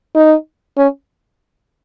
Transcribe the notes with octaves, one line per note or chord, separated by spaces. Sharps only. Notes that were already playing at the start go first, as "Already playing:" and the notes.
D#4
C#4